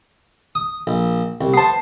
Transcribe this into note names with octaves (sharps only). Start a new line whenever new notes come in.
D#6
A#1
C2
B3 C5 A5 C7